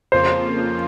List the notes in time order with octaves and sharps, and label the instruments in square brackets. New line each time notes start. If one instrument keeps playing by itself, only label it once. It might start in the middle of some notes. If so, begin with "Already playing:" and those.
[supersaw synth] F2 C#3 F3 A#3 F4 [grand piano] C5